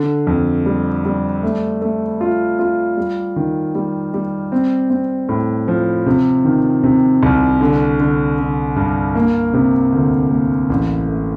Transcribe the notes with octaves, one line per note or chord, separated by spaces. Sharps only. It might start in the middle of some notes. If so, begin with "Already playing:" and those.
Already playing: D3
F2
G3
G3
A3
A3
F4
F4
G3
D#3
G3
G3
C4
C4
A2
F3
C3
D#3
C3
C2
D3
D3
D3
G2
A#3
C3
D2
A#3
A1
A3